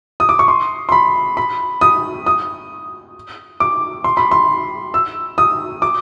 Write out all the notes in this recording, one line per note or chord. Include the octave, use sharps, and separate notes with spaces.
D#6
D6
C#6
C6
C6
B5
B5
D#6
D#6
D6
C6
B5
C6
E6
D#6
D6